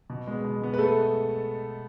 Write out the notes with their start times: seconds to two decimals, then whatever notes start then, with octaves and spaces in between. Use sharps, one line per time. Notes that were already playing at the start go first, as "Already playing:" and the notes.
0.10 B2
0.27 G#3 B3
0.44 B2
0.61 G#3 B3
0.74 B4
0.78 A3 A4